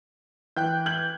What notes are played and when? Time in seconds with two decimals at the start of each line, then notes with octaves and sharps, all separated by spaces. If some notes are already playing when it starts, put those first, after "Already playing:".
0.56 E3 G5 F#6 G6
0.86 G6 G#6 F#7